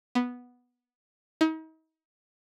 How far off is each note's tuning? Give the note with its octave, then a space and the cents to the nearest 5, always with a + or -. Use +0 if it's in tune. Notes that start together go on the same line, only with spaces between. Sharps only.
B3 -5
D#4 +40